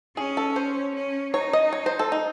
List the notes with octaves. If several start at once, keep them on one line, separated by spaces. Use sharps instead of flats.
C#4 G#4
A4
C5
C#4
D#4 C#5
D#5
C#5
C5
A4
D#4